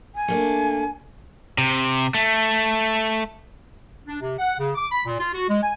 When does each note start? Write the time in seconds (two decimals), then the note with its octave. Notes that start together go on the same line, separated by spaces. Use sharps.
0.15 G#5
0.28 A3 A#3 D4
1.58 C3
2.15 A3
4.07 D4
4.21 C3
4.38 F#5
4.58 C#3
4.76 D6
4.91 B5
5.06 A#2
5.19 F4
5.33 F#4
5.49 G#3
5.62 G#5